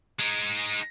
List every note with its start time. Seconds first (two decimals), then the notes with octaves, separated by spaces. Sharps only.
0.20 G#3 D#4